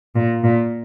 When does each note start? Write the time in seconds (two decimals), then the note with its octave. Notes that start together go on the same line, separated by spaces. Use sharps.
0.15 A#2
0.44 A#2